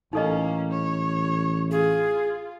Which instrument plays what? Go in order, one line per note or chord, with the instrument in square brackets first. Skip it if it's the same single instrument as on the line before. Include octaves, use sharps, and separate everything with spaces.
[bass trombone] A1 [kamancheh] A#3 C#4 [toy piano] D#4 A4 D#5
[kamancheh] C#5
[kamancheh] F4 [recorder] G#4